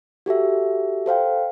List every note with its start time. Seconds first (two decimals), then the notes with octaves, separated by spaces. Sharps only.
0.26 F#4 G4 A4 E5
1.06 A4 C5 F5 G5